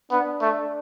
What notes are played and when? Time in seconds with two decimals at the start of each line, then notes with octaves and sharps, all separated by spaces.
0.11 B3 D4
0.41 A3